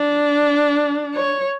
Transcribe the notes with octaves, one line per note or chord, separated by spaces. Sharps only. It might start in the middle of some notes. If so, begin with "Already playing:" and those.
Already playing: D4
C#5